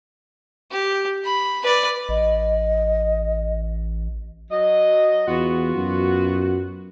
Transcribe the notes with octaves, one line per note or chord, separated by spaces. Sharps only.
G4
B5
B4 D5
A1 D#5
F#3 D#5
E2 B3 F4 F#4
F#2